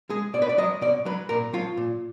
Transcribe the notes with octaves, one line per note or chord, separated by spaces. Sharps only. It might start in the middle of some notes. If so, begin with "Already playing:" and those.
G#3 G#4
B2 D5
B4
D5
F#3 D#5
B2 D5
F#3 B4
A#2 A#4
F#3 F4
A#2